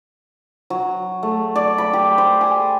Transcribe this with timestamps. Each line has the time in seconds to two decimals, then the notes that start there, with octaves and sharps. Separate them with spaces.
0.70 F#3
1.23 A3
1.55 D5
1.78 B5
1.93 G4
2.18 C5
2.41 G#5